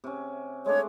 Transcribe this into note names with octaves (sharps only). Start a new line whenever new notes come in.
C3 C#4
G#3 A3 D4 C#5